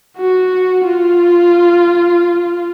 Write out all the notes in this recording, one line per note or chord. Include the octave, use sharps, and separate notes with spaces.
F#4
F4